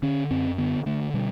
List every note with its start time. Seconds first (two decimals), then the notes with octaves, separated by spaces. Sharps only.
0.02 D3 C#4
0.31 F#2 C4
0.58 D3 B3
0.86 D3 A3
1.14 B2 G3